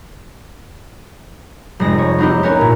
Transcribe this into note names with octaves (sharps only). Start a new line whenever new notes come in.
F1 F2 G#3 A#6
C#5
B3 C4 D#4 E4 G4
B3 C#4 A#4 C#5
A#2